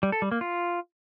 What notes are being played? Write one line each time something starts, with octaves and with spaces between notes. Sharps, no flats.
G3
A4
G3
A#3
F4